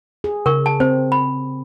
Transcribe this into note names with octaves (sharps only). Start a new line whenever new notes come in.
G#4
C#3 A#4 C#6
A5
C4 C5
B5